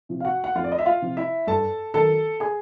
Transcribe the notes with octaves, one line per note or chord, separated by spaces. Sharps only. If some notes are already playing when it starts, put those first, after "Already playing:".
C3 F3
F5
F#4 F#5
F#5
F2 F4 F5
D5
D#5
E5
F4 F5
C3 F3
E4 E5
G2 A4 A5
D#3 F#3 A4 A5
G#4 G#5